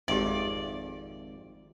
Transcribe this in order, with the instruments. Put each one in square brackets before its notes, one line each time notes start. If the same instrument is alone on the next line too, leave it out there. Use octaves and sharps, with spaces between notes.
[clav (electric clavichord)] G#1 F2 [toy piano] G4 E5 [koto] D5